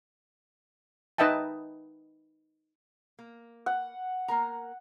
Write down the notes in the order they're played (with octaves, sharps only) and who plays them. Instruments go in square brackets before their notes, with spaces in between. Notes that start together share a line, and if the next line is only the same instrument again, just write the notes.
[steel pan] D#4 B4 D#5 E5 G5 A5
[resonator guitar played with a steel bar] A#3
[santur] F#5
[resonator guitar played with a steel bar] A#3 A#4 A#5